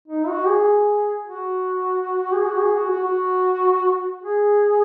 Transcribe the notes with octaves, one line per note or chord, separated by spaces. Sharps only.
D#4
F#4
G#4
F#4
G#4
F#4
G#4
F#4
F#4
F#4
G#4